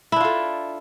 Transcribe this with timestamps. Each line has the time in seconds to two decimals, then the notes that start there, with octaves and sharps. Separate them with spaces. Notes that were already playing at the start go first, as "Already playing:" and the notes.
0.12 E4
0.16 D4
0.21 F4
0.25 A4